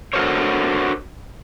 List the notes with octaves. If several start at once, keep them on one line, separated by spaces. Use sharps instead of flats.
D4 F#4 A4 A#4 C5 C#5